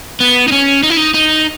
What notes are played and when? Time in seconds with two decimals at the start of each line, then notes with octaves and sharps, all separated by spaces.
0.20 B3
0.48 D#4
0.52 C#4
0.83 D#4
0.90 E4
0.97 D#4
1.14 D#4